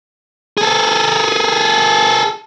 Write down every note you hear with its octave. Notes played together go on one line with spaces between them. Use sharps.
G#4 A4